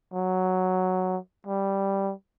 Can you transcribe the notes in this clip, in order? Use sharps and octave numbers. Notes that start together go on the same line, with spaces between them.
F#3
G3